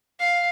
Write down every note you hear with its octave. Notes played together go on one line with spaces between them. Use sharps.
F5